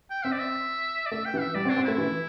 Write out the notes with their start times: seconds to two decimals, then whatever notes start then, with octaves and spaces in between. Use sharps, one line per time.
0.10 G5
0.24 C4 E5
0.32 D5
0.39 E5
1.06 D5
1.11 A3 E5
1.26 G5
1.34 E3
1.40 E5
1.55 G3 D5
1.65 C4
1.70 D4
1.77 C4
1.84 A3 E4
1.98 E3